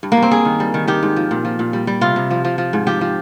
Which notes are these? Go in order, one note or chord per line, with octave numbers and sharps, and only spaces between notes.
G2
A#3
G2
C4
G2 G#4
D#3
G3
D#3
D#3 G4
G#2
F3
A#2
F3
A#2
G3
G3
C3 F4
C3
F3
F3
F3
G#2
F3 G4
F3